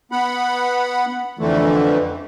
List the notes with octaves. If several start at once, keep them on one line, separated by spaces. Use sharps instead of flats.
B3 F#5 B5
F2 D3 E3 A3